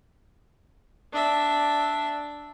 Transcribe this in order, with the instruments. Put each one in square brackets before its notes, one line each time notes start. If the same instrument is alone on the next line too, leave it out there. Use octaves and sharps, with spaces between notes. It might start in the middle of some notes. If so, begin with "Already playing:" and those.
[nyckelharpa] D4 E5